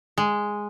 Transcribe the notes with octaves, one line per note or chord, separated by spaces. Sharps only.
G#3